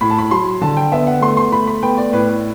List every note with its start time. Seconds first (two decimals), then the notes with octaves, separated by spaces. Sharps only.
0.01 A2 B5
0.10 A5
0.19 B5
0.31 F#3 C6
0.61 D3 A5
0.77 G5
0.92 B3 E5
1.07 F#5
1.22 A3 C6
1.37 C6
1.52 A3 B5
1.67 B5
1.83 B3 G5
1.98 D5
2.12 A2 B4